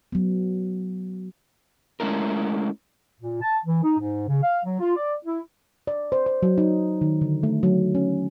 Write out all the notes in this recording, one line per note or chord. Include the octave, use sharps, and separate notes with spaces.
F#3 B3
G#3 A3 C#4 E4 A#4
A#2
A5
E3
D#4
G#2
C#3
F5
F#3
F4
D5
E4
D5
C5
C5
F#3
D#4
D#3
D3
A3
F#3
C#4